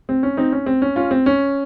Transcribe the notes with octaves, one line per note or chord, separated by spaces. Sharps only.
C4
C#4
C4 D#4
C#4
C4
C#4
C#4 F4
C4
C#4